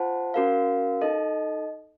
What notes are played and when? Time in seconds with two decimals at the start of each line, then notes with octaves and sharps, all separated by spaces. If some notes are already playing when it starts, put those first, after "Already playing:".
Already playing: F4 C5 F#5 A5
0.34 C#4 F#4 A#4 F5
1.01 D#4 A4 D#5